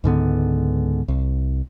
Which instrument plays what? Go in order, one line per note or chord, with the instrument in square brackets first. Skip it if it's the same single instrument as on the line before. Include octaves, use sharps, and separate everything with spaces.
[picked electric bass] C#2 G#2 D3 B3
C2